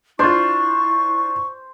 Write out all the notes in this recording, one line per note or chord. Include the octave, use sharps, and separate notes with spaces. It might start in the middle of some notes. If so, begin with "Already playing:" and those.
D4 E4 F4 C5 C#6